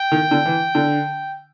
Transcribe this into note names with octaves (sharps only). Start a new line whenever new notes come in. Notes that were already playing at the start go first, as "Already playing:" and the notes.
Already playing: G5
D#3
D3
E3
D3